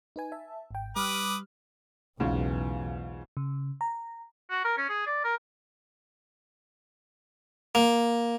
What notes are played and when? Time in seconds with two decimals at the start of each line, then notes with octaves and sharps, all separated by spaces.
0.16 D#4 B4 G#5
0.32 E5 A5
0.71 G#1 G5
0.96 G3 B4 D6 D#6 F6
2.20 B1 E2 G#2 C#3 F4
3.37 C#3
3.81 A#5
4.50 F#4
4.65 A#4
4.77 C#4
4.89 G#4
5.06 D5
5.24 A#4
7.75 A#3